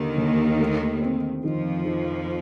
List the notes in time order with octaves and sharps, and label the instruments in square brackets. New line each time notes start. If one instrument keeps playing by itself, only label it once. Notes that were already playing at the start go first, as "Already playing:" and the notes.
Already playing: [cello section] D#2 D#3 [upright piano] D3
[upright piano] D3
A3
C4
[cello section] F2 F3 [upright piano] D#3
[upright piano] D#3